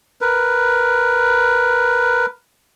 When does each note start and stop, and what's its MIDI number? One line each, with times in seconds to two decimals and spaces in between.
0.21 2.26 70
0.21 2.26 71